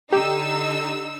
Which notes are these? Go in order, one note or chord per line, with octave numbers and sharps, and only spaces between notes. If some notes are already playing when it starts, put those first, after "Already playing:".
D3 D#4 G4 E6